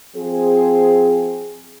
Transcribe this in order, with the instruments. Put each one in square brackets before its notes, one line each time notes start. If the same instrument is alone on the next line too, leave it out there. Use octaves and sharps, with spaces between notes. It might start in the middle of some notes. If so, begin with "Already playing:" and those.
[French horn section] F3 C4 G#4